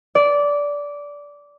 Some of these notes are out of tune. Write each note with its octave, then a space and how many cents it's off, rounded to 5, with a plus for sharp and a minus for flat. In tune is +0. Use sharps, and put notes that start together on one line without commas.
D5 -15